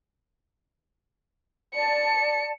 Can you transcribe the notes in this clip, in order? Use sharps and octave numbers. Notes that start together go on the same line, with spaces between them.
D5 A5 C#7